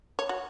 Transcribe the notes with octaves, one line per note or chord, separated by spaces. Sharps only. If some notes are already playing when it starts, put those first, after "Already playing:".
C#5
F#4